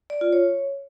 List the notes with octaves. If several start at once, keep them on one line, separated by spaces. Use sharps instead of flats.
D5
F4
C#5